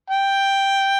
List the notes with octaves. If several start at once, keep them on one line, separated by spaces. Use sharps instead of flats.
G5